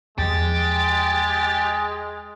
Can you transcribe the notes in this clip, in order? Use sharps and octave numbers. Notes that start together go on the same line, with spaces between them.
E2 F3 G#3 G4 A6